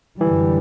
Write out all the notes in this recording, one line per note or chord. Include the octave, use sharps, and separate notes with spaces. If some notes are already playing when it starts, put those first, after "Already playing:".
F#2 D3 E3 G3